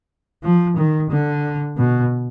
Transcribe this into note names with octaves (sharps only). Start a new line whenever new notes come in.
F3
D#3
D3
B2